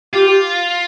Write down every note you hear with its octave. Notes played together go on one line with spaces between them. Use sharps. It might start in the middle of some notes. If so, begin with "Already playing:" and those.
F4 G4
G4